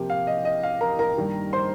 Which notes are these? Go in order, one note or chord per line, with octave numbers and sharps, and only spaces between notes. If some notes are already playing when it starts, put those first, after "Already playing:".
Already playing: C3 F3 A#3 G4
F5
D#5
D#5
F5
A#4 A#5
A#4 A#5
G2 D#3 A#3
C5 C6